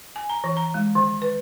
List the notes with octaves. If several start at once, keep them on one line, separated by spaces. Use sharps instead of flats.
G#5
A#5
E3
A#5
G#3
D#3
B4